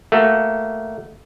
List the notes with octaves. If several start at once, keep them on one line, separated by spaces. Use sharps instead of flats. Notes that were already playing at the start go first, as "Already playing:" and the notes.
A3 A#3 F#4